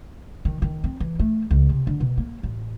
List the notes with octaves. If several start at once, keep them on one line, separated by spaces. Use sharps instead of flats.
D#3
D#3
C4
E3
A3
C#2
C3
D3
B2
A#3
A1